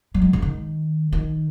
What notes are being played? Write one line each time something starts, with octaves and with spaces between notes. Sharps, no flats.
F#3
G#3
C#3
D#3
D#3